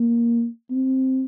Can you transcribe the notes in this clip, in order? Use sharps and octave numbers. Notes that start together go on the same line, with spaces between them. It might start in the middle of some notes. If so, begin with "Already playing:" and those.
Already playing: A#3
C4